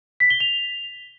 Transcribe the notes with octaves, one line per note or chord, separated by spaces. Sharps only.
B6
G7
F7